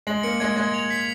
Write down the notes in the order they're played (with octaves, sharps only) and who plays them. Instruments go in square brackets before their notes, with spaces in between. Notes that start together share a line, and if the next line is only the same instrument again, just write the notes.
[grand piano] G#3 [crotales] F#7
[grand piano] A#3 [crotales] C#7
[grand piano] G#3 [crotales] G#6
[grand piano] G#3 [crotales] G#6
[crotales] F7
B6